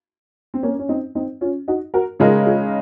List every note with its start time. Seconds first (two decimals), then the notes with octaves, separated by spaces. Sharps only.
0.54 C4
0.63 A#3 C#4
0.79 C#4
0.89 C4 D#4
1.15 C4 D#4
1.41 C#4 F4
1.68 D#4 F#4
1.94 F#4 A#4
2.19 C#3 G#3 D#4 F4 G#4 A#4
2.46 F4 G#4